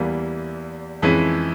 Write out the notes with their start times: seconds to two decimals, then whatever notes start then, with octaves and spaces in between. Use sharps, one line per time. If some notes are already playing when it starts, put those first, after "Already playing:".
Already playing: E2 E3 G3 A#3
1.02 F2 E3 G#3 C#4 E4